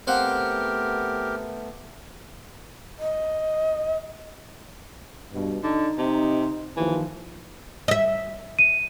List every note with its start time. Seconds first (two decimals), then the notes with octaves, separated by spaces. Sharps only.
0.07 A3 B3 C4 G4 A#4 F5 F#5
2.99 D#5
5.34 G2 B2
5.63 D3 D#4
5.98 C3
6.77 D#2 E3 F3
7.88 D#5 E5
8.59 D#7